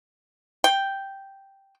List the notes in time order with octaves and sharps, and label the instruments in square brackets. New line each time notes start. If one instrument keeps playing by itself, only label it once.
[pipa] G5